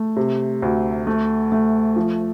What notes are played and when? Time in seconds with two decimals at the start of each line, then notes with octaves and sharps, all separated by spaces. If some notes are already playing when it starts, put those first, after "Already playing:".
Already playing: A3
0.16 C3
0.62 D2
1.07 A3
1.52 A3
1.96 F3